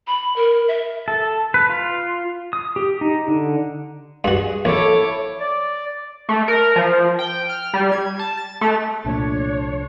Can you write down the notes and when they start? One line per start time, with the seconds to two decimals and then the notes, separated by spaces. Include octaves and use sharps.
0.07 B5
0.36 A#4
0.68 E5
1.08 A4
1.54 B4
1.70 F4
2.53 D#6
2.76 G4
3.01 D#4
3.28 D3
4.24 G2 F#4 G#4
4.65 A#1 E4 A4 C#5 D6
5.40 D5
6.29 A3
6.48 A#4
6.76 F3
7.19 G5
7.49 F6
7.74 G3
7.92 G#6
8.19 A5
8.37 A6
8.61 A3
9.05 C2 A#2 F3 A3 D4 C#5